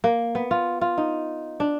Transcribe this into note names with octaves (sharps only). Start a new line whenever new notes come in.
A#3
B3
F4
F4
D#4
D4